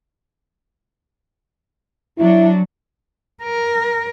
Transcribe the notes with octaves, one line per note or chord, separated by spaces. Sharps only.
F#3 D4 E4
A#4